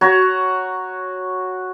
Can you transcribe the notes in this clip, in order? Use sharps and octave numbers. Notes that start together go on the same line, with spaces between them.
F#4 C#5 A#5